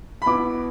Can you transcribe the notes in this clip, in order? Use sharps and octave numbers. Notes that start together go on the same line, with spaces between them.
B5
B2 B3 E4 D6